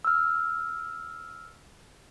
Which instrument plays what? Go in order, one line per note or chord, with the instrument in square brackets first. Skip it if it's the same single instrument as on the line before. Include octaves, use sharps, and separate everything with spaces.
[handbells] E6 F6